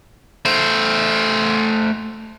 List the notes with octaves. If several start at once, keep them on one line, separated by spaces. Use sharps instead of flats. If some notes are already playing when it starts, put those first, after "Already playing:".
A3 C5